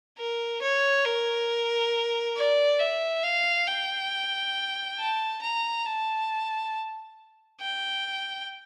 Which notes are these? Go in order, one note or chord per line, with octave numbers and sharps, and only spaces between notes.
A#4
C#5
A#4
D5
E5
F5
G5
A5
A#5
A5
G5